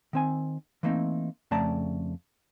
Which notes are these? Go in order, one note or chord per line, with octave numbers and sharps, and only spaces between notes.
D#3 C4 G#5
E3 A3 A#3 C4 D#4
F2 C#3 A3 D5 A5 A#5